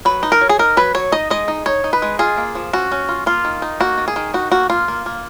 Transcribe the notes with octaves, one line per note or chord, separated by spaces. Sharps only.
F#3 B4
D#4
A#4
F#3
G#4
D#4 A#4
F#3 B4
F#3 C#5
D#4 D#5
G#3 D#5
D#4
D#4 C#5
D#4
B4
G#3
F4 G#4
A#3
F3
C#4 F#4
C#4
F4
A#3 F4
D#3
D#4
A#3 F#4
D#3
G#4
D#3
D#4 F#4
A#3 F#4
A#3 F4
A#3
A#3